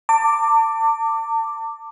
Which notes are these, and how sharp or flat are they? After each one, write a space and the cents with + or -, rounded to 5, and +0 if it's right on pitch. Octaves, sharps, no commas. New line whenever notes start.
A5 +35 D6 +0